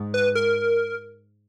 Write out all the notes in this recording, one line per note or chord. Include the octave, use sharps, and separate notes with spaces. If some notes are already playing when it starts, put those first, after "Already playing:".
Already playing: G#2
B4
A#4